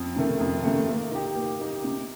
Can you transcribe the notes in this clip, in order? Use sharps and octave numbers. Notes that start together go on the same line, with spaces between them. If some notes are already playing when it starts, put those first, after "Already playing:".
Already playing: F2
C3 D#3 A3
F2
C3 D#3 A3
A#3
D#4 G4
A#3
D#4 G4
C3